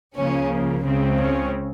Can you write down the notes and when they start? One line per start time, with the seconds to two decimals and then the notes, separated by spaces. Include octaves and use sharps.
0.17 C#2 C#3 F3 A#3 C#4
0.84 C#2 C#3 G#3 C4
1.17 C#4